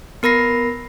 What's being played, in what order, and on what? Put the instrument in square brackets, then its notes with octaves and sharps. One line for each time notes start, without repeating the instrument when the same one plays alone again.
[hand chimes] B3 A#4 B5 A#6 C7